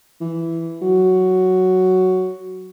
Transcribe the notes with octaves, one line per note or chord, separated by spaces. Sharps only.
E3
F#3